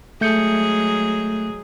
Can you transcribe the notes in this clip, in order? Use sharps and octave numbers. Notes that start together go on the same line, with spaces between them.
F#3 G#3 A3 G#4 G6 C#7